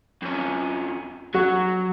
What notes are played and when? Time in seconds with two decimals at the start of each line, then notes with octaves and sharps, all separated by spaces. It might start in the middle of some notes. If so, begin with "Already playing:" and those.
0.22 F2 C#4
1.34 F#3 F#4